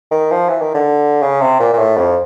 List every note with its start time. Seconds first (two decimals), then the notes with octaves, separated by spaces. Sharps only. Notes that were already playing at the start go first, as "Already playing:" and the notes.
0.11 D#3
0.31 F3
0.49 E3
0.62 D#3
0.74 D3
1.23 C#3
1.41 C3
1.60 A#2
1.73 A#2
1.79 A2
1.97 F2